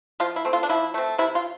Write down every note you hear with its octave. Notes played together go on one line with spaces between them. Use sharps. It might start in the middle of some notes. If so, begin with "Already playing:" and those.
F3 F4
E4
A3 C4
F4
D4
F3 E4
A3 C4
C3 E4
F4